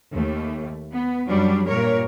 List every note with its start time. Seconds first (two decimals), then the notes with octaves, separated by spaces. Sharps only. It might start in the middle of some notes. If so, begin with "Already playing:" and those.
0.14 D#2 A3
0.90 B3
1.30 F#2 F#3 G3 D4
1.67 G2 A#2 A#4 C#5